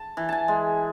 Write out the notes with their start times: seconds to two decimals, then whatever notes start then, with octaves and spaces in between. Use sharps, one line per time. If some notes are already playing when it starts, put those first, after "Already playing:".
Already playing: A5
0.17 E3
0.29 G#5 A5
0.48 G#3